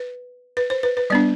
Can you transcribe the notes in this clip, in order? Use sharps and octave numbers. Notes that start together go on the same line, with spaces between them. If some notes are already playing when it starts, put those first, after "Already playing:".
Already playing: B4
B4
C5
B4
B4
G3 B3 D4 D5